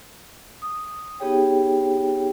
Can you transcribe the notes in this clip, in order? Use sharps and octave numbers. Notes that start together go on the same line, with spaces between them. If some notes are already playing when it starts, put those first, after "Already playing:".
D#6
B3 D#4 G4 G#4 C#5 G5